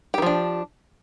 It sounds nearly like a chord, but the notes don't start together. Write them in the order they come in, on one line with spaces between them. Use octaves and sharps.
G4 D#3 F3 D4